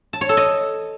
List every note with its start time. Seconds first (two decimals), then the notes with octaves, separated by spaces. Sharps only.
0.13 A5
0.21 C#5
0.29 A4
0.37 D#5